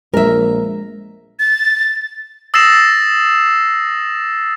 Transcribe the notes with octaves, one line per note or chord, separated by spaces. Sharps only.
A#1 G#3 A#4 E5
A6
D#6 E6 A6 A#6 C7 E7